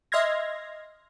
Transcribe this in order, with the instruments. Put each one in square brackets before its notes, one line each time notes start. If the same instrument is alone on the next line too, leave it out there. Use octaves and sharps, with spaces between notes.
[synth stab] D#5 E5 C6 F6 G#6 A#6